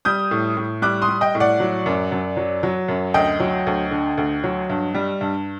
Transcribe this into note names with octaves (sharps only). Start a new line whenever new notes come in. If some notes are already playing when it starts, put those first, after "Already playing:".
G3 D#6 G6
A2
A2
G3 D6 F#6
C6 D#6
G3
D#5 G5
A2
D5 F#5
F#3
F#2
F#2
F#3
F#3
F#2
D2 D#5 G5
F#3
D2
D3
D2
F#3
G2
G3
G2